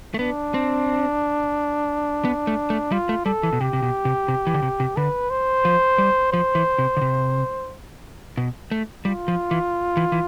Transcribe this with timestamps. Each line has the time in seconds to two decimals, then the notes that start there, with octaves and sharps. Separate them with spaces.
0.14 A3
0.19 B3 D4
0.54 C4
2.25 B3
2.47 A3
2.70 A3
2.92 G3 F4
3.09 A3
3.26 G3 A4
3.43 E3
3.53 B2
3.61 C3 G4
3.73 C3
3.82 B2
4.05 C3
4.28 C3
4.47 E3
4.54 D3
4.62 C3
4.80 C3
4.97 D3 B4
5.30 C5
5.65 F3
5.98 G3
6.32 F3 C5
6.55 E3
6.78 C3
6.97 D3
7.01 C3
8.37 B2
8.71 A3
9.05 G3 F4
9.28 F3
9.51 E3
9.97 E3
10.12 E3